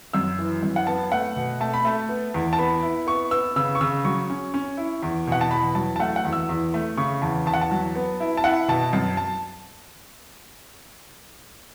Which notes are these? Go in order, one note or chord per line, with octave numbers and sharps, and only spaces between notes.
F#2 E6
E3
F#2
F#5
B3 A5
A3 F#5
B2
A3 A5
B5
A3 A5
B3
E2
A5
B3 B5
E4
B3 C#6
B3 E6
C#3 E6
C#6
C#3 E6
F#3 C#6
C#4
C#4
E4
E2
B2 F#5
A5
E2 B5
F#3 A5
A5
A3 F#5
F#5
E2
E6
E2
A3
C#3 C#6
E2 A5
E2 A5
F#5
A5
F#3
B3
E4
A5
E4 F#5
B2 A5
F#2 A5
A5